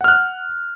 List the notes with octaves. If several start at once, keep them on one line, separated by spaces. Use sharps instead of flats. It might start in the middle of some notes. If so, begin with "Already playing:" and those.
F#5 F6 F#6